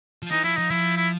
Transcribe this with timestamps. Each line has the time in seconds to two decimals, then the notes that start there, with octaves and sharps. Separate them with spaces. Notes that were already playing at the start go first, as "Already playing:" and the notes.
0.22 F3
0.31 E3 D#4
0.44 F3 E4
0.57 F3 D#4
0.70 F3 E4
0.97 E4